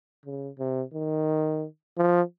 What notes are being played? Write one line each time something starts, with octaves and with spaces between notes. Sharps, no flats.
C#3
C3
D#3
F3